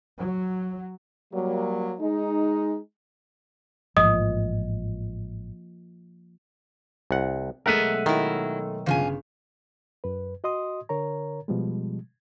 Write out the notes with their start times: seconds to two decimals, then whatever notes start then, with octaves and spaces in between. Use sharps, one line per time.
0.19 F#3
1.33 F#3 G3 A#3
2.00 G#3 D#4
3.97 A1 G#2 F3 A#3 D#5 D#6
7.11 C2 F#5
7.66 B1 G#3 A3 A#4 E5 F#5 D#7
8.06 D#3 F#3 E4
8.86 G1 G#2 C#3 F4 G#5
10.04 F#2 B4
10.44 F#4 D#5 C6 D#6
10.89 D3 A#4 C#5 A#5
11.48 B2 F3 G3 G#3